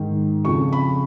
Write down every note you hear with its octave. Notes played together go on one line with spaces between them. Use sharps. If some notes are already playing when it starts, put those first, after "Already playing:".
Already playing: G#2 D#3
F2 C#3 C#6
B5